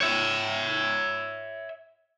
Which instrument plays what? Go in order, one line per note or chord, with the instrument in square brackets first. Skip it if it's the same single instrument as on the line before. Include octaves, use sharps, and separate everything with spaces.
[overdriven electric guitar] C#5 E5